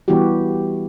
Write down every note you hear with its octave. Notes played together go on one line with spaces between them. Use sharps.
E3 G3 B3 E4 F#4 G4